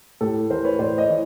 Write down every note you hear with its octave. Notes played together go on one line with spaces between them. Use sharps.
A2 G4 A4
E3 A#4 C5
B4 C#5
A2 C5 D5
C#5 D#5
E3